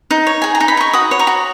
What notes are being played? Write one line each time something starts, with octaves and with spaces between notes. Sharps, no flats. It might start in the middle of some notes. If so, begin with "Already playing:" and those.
D#4
C#5
G#4 G#5
A#5
D#4
B5
D#4 C#6
F#4 B5 D#6
C#5
A#5 C#6
F#4